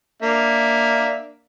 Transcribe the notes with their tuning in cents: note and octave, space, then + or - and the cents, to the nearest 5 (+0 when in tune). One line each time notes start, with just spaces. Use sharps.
A#3 +0 D4 +0 E5 +0